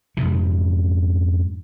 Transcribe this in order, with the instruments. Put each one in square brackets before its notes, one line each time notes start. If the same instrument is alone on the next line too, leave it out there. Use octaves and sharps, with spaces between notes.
[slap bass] F2 G#2 C3 E3